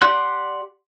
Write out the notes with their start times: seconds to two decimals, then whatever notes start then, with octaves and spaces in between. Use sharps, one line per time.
0.02 G4 D5 F#5 C6 F#6